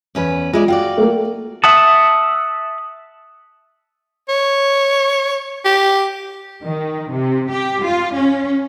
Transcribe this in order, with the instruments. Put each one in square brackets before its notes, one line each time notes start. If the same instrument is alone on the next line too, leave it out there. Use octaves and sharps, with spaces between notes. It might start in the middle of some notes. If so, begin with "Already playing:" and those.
[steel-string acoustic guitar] E2 C#4 B4
[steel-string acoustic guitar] G#3 E4 D5 [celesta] F4
[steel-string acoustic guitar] F4 F#4 D5 [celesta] G5
[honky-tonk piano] A3 A#3
[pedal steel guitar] E5 F#5 A5 [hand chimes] D#6
[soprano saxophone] C#5
G4
[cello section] D#3
C3
G4
F4
C#4